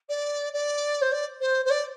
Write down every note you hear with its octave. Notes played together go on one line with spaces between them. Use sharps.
D5
D5
C5
D5
C5
C5
D5